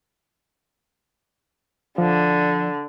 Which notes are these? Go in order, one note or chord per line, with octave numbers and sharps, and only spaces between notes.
D3 F3